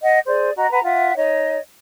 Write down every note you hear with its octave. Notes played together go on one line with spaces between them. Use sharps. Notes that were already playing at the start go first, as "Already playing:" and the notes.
D#5 F#5
G#4 C5 D5
F#4 D#5 A#5
B4 F#5 A#5
F4 E5 F#5
D#4 C#5 D#5